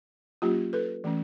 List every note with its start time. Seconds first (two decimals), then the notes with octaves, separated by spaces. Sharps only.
0.42 F#3 A#3 C#4 F4 G4
0.73 A4 B4
1.04 E3 A3 C#4